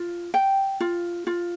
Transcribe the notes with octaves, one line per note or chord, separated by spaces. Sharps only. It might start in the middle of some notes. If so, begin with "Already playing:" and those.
Already playing: F4
G5
F4
F4